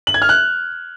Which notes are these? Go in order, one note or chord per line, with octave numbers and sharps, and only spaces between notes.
F#7
G#6
F6
F#6